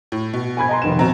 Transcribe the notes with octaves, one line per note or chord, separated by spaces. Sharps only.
A2
B2
G#5 B5 G#6
D#5 A#5 C6
F1 D#3 E7
B2 C4 A#5